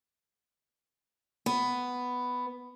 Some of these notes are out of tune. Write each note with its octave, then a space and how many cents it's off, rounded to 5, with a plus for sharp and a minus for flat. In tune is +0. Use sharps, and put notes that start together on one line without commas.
B3 +5